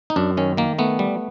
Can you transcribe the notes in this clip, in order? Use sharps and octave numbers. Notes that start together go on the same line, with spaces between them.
D#4
F#2 D4
D#3 C#4
D#3 A#3
A3 B3
G3